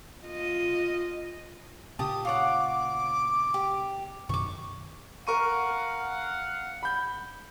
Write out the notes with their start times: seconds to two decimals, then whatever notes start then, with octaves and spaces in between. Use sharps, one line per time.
0.25 F4 D#5
1.99 A#2 C#3 G4 A5 D#6
2.25 F4 C#5 F#5 D6
3.54 G4
4.29 F#2 B2 D#3 C#6 D6
5.27 A#4 F5 F#5 C#6 D#7
6.83 B5 G6